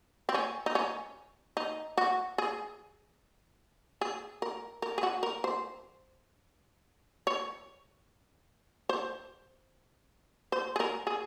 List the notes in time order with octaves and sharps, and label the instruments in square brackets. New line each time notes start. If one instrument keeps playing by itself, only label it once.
[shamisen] C4
C#4
D#4
C#4
D#4
F#4
G#4
G#4
A#4
A#4
G#4
F#4
A#4
C5
C#5
C5
C5
G#4
A#4
G#4